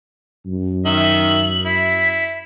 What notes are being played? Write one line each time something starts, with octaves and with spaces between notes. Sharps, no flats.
F#2
D#3 E5 F#7
E4 B6